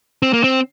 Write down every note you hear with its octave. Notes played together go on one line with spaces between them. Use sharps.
C4
A#3
C4